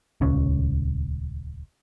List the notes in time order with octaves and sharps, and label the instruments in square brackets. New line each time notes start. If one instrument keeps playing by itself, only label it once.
[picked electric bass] D#1 C#2 C#4